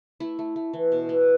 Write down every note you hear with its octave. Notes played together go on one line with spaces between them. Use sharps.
A3 E4
A3
A3
E3
B2
B3